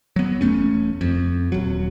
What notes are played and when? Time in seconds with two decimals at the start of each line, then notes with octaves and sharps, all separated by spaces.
0.16 F#3 B3
0.41 E1 A2 A3 C#4
1.01 F2
1.52 D#1 F#3